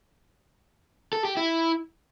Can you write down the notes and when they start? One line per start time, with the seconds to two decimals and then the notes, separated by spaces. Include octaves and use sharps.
1.13 A4
1.25 G4
1.37 E4